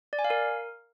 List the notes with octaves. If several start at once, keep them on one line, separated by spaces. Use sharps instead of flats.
D5
G#5
F5
A#4